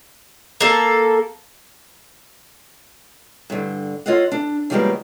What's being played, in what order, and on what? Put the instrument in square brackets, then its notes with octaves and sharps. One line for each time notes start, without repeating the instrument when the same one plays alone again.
[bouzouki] A#3 A4
[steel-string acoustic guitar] G2 D3
F4 A4 C#5 D#5 F5 F#5
D4
C#3 F3 G3 G#3 A#3 B3